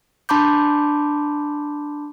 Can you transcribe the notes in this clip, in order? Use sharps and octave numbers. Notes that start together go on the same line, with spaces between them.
D4 A5 B5 C6 D6 G6